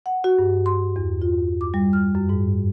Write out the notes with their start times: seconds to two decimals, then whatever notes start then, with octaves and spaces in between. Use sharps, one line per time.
0.06 F#5
0.24 F#4
0.39 G2
0.66 C6
0.96 E2
1.22 F4
1.61 D6
1.74 G3
1.93 F6
2.15 F#2
2.29 G#2